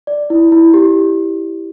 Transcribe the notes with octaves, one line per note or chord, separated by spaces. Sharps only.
D5
E4
E4
G4